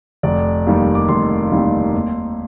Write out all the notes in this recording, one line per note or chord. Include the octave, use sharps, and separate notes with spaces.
F1 D5
D#2 D#3 G3
D6
F1 C6
D#2 D#3 G3
D#2